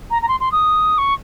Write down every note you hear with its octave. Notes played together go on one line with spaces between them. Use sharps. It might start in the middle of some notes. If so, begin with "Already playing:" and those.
A#5
A#5
C6
C6
D#6
C#6